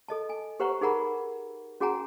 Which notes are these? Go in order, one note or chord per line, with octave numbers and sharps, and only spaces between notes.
A4 D#5 A5
G#5
G4 B4 C5 F#5 A#5 C#6
D#4 G#4 A#4 F#5 A#5 B5
C#4 F#4 G#4 F#5 G#5 A#5